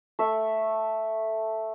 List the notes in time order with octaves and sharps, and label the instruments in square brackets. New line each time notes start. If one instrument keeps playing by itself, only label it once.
[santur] A3 E5